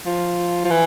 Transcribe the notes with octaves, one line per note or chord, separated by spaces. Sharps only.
F3
F3
E3